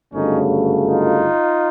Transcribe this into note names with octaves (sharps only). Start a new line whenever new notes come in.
G1 F#2 C#3 F#3 A3 C#4 D#4
D#4 F4